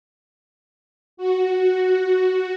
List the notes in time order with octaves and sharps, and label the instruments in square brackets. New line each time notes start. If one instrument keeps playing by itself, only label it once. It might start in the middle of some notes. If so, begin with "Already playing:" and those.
[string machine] F#4